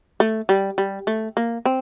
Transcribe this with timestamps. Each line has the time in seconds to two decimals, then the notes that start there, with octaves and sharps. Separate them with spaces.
0.20 A3
0.49 G3
0.78 G3
1.07 A3
1.37 A#3
1.66 C4